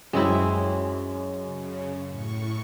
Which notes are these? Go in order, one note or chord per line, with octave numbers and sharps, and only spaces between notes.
F#2 G#3 C4 E4
C#3
A2 C#6